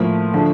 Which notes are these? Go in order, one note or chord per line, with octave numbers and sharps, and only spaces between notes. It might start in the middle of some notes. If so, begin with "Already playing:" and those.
Already playing: A2 F3 A#3
D3 F3 A3